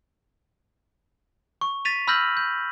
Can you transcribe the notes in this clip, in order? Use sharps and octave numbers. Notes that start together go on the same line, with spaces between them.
C#6
A6 B6 D#7 F7
B5 E6 F6 G6 A#6 F#7
G6